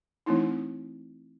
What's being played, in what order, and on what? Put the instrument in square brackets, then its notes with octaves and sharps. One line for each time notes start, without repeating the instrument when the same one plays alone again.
[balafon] E3 A3 C4 D#4 E4